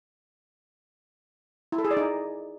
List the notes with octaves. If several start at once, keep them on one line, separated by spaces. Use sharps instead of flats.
E4
A4
G#4
D5
D#4